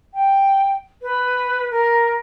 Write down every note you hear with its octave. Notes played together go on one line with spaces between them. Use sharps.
G5
B4
A#4